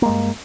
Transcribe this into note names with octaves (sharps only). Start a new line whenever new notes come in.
G2 G#3 A#3